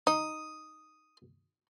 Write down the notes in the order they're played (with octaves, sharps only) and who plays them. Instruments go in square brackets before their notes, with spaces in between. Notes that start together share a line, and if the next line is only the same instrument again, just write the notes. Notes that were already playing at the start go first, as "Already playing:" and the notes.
[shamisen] D#4 [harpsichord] D#6